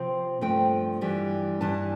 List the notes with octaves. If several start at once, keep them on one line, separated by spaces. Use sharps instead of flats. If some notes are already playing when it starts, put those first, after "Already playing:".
Already playing: C3 F3 C4
G2 F3 A3 C4 G5
G2 E3 G3
G2 E3 G3 A5